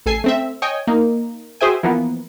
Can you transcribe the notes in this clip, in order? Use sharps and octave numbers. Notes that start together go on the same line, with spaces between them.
A1 A4 G#5 C7
A3 C4 E5
C#5 D#5 G5 G#5
A#3 D#4
F#4 G#4 C5 E5 G5 G#5
E3 F3 A#3 B3